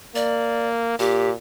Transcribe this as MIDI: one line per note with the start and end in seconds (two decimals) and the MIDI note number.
0.15 0.96 58
0.15 0.68 74
0.99 1.34 46
0.99 1.30 67